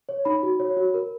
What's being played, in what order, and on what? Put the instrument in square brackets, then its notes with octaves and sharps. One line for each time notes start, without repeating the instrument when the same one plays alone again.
[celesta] C#5
D#4 B5
F#4
C#5
F#4
A#4